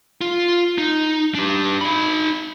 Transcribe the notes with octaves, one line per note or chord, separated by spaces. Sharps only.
F4
D#4
D4 G4
D#4 B5